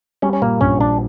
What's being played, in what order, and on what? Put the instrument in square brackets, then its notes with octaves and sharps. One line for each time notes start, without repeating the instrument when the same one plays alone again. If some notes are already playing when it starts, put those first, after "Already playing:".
[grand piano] G3 [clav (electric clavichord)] C#4
[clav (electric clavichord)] C#4
[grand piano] A#2 [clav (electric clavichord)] A#3
[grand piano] A#1 [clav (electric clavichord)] C#4
[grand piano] A#1 [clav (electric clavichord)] D4